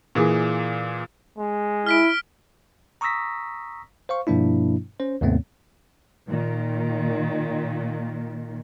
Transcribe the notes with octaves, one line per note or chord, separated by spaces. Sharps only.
A#2 E3 G#4
G#3
E4 F6 B6 D7
A#5 C#6 D#6 E6 A#6 B6
C5 F5 C#6
G2 B2 F3 A#3 D4 E4
C#4 C5
D#2 G#2 C3 A3 B3 C4
A#2 D#3